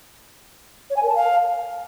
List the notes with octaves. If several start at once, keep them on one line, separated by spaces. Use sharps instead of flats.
C#5
G#5
A#4
A5
F5